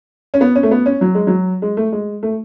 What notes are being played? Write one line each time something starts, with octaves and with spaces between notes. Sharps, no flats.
C#4
B3
C#4
A3
B3
C#4
F#3
G#3
F#3
G#3
A3
G#3
A3